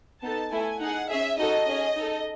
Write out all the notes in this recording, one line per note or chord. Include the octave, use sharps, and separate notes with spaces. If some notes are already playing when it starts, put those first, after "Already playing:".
B3 D#4 A4 A5
A3 E4 A4 G#5
D#4 G#4 F#5
C#4 G#4 E5
D#4 F#4 A4 D#5
C#4 G#4
D#4 A4